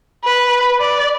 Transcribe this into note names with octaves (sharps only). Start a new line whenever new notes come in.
B4
D5